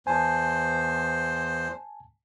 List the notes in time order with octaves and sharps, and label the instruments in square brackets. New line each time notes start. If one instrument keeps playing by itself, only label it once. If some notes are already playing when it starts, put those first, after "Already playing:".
[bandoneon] E2 C5 [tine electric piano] G#5 A5